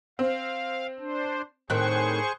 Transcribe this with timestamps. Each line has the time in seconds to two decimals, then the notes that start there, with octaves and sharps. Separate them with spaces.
0.19 C4 F5
0.99 D4 C5
1.70 A2 D#3 C4 G#4 C5 C#6 F#6